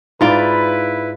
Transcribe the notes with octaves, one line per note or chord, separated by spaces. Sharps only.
G#2 E4 F4 B4 D5